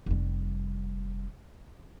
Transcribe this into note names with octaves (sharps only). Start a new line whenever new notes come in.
F1 G3